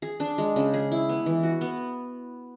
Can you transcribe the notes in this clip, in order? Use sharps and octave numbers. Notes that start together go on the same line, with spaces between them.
G#4
D4
G#3
C#3
G#4
E4
B3
E3
F#4
B3